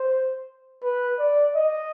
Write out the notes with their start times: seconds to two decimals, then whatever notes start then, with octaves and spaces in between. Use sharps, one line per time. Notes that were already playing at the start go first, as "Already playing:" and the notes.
Already playing: C5
0.83 B4
1.19 D5
1.56 D#5